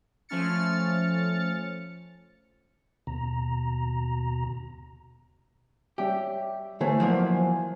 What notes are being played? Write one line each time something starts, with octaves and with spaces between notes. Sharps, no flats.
F3 A3 C#4 F6 A6 C#7
D#2 B2 A#5
G3 G4 C#5 E5
D3 E3 A3 C5 G#5
F3 F#3 A#3